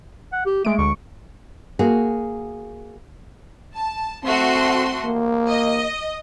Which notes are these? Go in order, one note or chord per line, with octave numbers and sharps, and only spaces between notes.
F#5
G4
G#3 A3 D7
D2 C#6
A#3 F#4 G#4
A5
A3 C4 F#4 C6
A#3
D#5